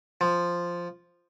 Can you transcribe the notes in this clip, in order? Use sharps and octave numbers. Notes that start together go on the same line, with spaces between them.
F3